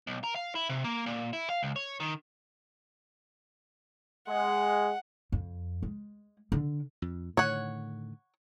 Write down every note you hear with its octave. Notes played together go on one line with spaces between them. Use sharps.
B1
A#4
F5
E4
C3
A#3
A#2
E4
F5
C#2
C#5
D#3
G#3 F#5
F2
G#3
D3
F2
A2 D3 D#3 C#5 F#5